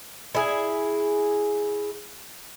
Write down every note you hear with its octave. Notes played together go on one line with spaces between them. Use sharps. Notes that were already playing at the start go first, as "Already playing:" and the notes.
E4 G#4